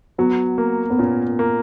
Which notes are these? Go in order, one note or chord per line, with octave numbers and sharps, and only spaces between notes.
F#3 B3
A#3
B3
A#2 C#4
A#3